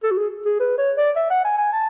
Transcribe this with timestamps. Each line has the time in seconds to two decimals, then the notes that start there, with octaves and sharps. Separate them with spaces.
0.03 A4
0.11 F#4
0.17 G#4
0.45 G#4
0.60 B4
0.78 C#5
0.97 D5
1.16 E5
1.30 F#5
1.44 G#5
1.58 G#5
1.73 A5